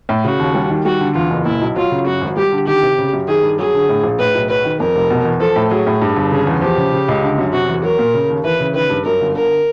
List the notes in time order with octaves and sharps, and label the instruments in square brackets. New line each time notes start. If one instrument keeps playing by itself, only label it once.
[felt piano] A2
[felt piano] C#3 [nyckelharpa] F#4
[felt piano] D#2
G3
D#3
[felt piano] G3 [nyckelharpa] F#4
[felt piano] D3
[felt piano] E2 [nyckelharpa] F4
[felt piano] F#1
[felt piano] A#2 [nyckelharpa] E4
[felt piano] B1
[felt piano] F#3 [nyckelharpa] F4
[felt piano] C#3
[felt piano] F#2 [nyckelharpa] F#4
[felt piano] G#1
[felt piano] G3 [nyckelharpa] G4
[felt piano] D3
[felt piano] D#3 [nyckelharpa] G4
[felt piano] C3
C#3
F#2
[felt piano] D#3 [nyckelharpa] G#4
[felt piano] G2
[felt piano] F#3 [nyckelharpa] G#4
[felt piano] D3
A2
A#1
[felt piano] A2 [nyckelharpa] B4
[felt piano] B1
[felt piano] F#3 [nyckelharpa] B4
[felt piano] D#3
[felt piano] F2 [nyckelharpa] A#4
[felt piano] F1
B2
E2
[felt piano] F3 [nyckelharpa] A4
[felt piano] A2
[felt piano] F#3 [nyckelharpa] G#4
[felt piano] A2
G2
G1
[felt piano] C#3 [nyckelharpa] G#4
[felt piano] E2
[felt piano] F3 [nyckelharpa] G4
[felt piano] C#3
C#3
C#2
D3
F#2
[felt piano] C3 [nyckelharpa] F#4
[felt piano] E2
[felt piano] F#3 [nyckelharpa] A#4
[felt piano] A#2
C#3
D#2
[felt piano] E3 [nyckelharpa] B4
[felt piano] C#3
[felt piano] D#3 [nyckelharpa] B4
[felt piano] G2
[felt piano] F#2 [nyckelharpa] A#4
[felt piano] G1
[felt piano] D3 [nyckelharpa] A#4